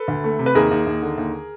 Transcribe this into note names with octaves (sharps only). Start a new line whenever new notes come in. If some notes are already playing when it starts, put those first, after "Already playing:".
Already playing: A4 B4
D2
A3
C3
B4
D#2 G#4 A#4
D#2
D#2
D3
D#2